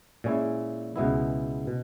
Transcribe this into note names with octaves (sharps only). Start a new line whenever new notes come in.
A#2 G#3 C#4 E4
C#2 B2 G#3 B3 E4
B2